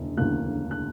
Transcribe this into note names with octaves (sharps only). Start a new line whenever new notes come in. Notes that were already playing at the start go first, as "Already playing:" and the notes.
Already playing: E1 D2 C#3 E3 A#3
E1 D2 C#3 E3 A#3 F#6
F#6